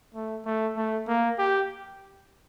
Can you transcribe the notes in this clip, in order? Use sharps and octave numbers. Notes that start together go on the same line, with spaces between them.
A3
A3
A3
A#3
G4